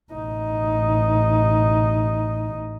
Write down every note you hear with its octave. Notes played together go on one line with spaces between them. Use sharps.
A1 D#4